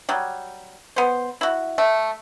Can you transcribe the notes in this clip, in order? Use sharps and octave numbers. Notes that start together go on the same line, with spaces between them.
F#3 G3
B3 C5
E4 F#4
A3